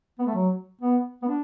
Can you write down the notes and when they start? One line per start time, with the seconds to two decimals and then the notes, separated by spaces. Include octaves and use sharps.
0.19 B3
0.26 A3
0.34 F#3
0.81 B3
1.22 B3
1.28 D4